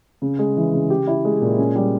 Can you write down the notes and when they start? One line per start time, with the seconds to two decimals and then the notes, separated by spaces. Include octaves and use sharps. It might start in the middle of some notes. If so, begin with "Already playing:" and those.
0.22 C#3
0.39 G#3
0.57 E3
0.73 C#3
0.90 G4
1.07 E4
1.25 G#3
1.41 A#2
1.58 C#4
1.76 G3